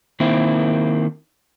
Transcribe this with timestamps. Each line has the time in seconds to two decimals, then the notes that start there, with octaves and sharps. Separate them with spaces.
0.20 D#3 A#3 C4 E4